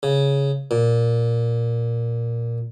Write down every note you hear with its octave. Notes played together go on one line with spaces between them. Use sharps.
C#3
A#2